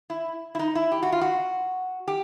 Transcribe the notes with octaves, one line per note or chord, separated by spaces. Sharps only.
E4
E4
D#4
E4
G4
F#4
F4
F#4
G4